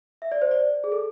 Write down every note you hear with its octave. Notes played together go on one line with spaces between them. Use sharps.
E5
D5
C5
D5
G#4
A4